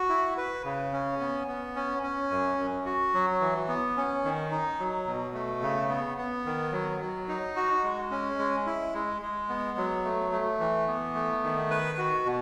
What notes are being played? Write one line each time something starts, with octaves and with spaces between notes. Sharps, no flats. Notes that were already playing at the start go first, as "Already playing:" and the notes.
Already playing: F#4
E4
B4
C#3
C#4
B3
B3
C#4
C#4
F#2
F#2
F#4
F#3
E3
B3
C#4
D#3
D#4
F#3
B2
A3
C#3
B3
B3
D#3
F#3
F#3
D#4
F#4
G#3
C#4
G#3
E4
G#3
G#3
B3
F#3
A3
A3
E3
B3
A3
D#3
B4
F#4
B2